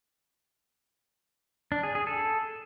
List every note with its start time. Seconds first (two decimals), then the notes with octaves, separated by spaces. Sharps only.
1.72 D4
1.83 G#4
1.95 G#4
2.07 A4